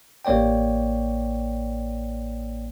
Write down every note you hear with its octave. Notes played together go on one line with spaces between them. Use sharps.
A1 A#3 C#5 D5 G5